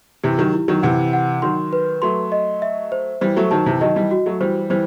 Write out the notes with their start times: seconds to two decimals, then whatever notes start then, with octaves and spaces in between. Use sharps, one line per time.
0.24 C3 E3 G4
0.38 D#3 F#3
0.54 E4
0.68 D#3 F#3
0.83 C3 E3 F#5
1.13 F#5
1.42 D#3 F#3 C6
1.73 B4
2.02 F#3 A3 C6
2.32 D#5
2.62 E5
2.92 C5
3.21 E3 G3 C5
3.37 F#3 A3
3.51 D#3 F#3 A5
3.66 C3 E3
3.81 D#3 F#3 D#5
3.96 E3 G3
4.11 F#4
4.26 F#3 A3
4.40 E3 G3 C5
4.70 E3 G3 C5